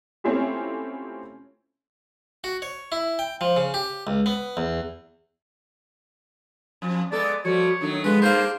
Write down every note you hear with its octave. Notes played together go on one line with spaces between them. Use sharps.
A3 C4 C#4 E4 F4 G4
F#4
C#5
E4
G5
F3
C#3
G4
C#2
B3
E2
F2 F3
G#3 B3 A4 D5
F3 G3 A3 F#4 C#5
D#3 F#3 A3 D4
F3 G#3 B3 G#4 B4
G2 A#3 D4 F4 C5 F5